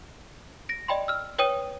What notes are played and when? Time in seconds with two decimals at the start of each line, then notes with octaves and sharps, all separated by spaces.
0.69 A#6 D7
0.88 D5 D#5 G5 B5 C6
1.08 E6 F6
1.38 B4 C#5 G5 D#6 D#7